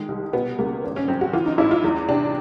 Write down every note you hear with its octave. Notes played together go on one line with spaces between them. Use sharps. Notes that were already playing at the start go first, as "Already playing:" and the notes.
Already playing: D#3 G#3
C2
B2 B3
C#2 A#3
G#1
C#4
F#2 C4
F#4
E3 F4
D#4
A1 E4
F4
E2
C3 D4